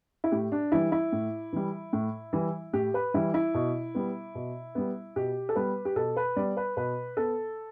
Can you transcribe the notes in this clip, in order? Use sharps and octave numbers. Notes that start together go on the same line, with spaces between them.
E4
A2 G4
D4
E3 G3 E4
E4
A2
E3 G3
A2
E3 G3
A2 G4
B4
E3 G3 E4
E4
B2
G3 B3
B2
G3 B3
B2 G4
A4
G3 B3 B4
G4
B2 A4
B4
G3 B3 D5
B4
B2 B4
B3 A4